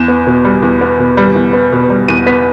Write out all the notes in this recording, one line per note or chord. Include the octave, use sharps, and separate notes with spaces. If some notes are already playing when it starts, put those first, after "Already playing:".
Already playing: E2 E7
B3
B2
G3
E2
B3
B2
G3
E2
B3
B2
G3
E2 D#7
B3 B6